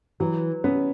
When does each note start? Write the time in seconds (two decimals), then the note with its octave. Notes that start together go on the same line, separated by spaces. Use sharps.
0.20 E3 F#3
0.64 B3 C#4